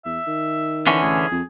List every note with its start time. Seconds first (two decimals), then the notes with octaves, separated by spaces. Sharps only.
0.05 E2 E5
0.27 D#3
0.87 D3 E3 C#4
1.02 A1 G#4
1.31 F2